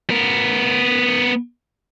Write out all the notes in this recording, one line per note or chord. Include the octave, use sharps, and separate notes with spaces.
B3 A#4